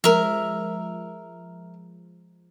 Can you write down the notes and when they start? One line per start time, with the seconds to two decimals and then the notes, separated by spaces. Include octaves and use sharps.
0.04 F3 G#3 A#4 E5